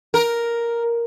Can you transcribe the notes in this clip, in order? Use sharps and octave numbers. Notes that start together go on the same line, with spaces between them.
A#4